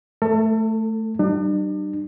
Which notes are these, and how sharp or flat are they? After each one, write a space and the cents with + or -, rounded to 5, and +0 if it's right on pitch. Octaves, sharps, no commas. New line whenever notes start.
A3 +0 A4 +35
G3 -35 D4 +45